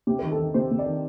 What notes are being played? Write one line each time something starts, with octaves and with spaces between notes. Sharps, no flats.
C3 G4
D#3 A#4
A4
D#3
C3 C5
C3
D5
D#3